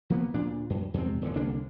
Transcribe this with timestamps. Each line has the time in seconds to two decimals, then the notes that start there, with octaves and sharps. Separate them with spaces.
0.10 F3 A#3 B3
0.34 D2 A#2 D4
0.70 F#2
0.94 E2 G#2 C3 C4
1.21 D1 E2 D3
1.36 C2 D3 A#3 D4